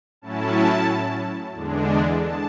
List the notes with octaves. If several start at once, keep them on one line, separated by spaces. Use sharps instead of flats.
A2 F#3 C#4 E4 A5
E2 D3 G#3 D4
A5